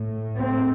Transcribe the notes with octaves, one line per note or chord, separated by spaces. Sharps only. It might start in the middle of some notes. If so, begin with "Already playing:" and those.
Already playing: A2
C4